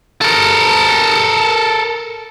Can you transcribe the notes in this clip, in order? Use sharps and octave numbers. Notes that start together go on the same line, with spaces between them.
A4 A#4